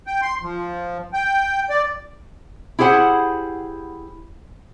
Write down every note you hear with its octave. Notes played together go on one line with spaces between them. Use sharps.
G5
C6
F3
G5
D5
E4 G4 G#4 C5 F#5